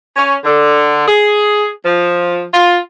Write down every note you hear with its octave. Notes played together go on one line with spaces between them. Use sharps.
C#4
D3
G#4
F3
F4